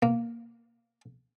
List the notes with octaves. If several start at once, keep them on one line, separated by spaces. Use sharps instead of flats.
A#3